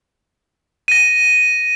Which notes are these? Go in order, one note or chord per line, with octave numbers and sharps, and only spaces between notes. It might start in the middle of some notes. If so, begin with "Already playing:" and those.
A#6 D#7